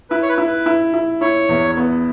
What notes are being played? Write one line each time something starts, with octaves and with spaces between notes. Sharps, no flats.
E4 B4
C#5
B4
E4
B4
E4
E4
E4 C#5
E2
B3